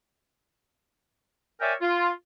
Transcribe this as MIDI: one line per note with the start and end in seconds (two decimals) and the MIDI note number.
1.60 1.73 70
1.60 1.73 73
1.60 1.73 74
1.60 1.73 76
1.60 1.73 79
1.60 1.73 80
1.82 2.10 65